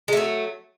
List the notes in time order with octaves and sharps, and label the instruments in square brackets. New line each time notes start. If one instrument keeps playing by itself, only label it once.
[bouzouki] G#3
A3
F#3